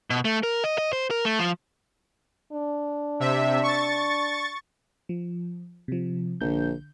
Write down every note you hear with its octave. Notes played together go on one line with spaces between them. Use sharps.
B2
A3
A#4
D#5
D#5
C5
A#4
A3
F3
D4
C3 E5
C#6 A6
F3
C3 F3
A#1 D3 G6